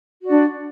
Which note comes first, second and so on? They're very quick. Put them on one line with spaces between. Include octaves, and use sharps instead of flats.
F#4 D5 D4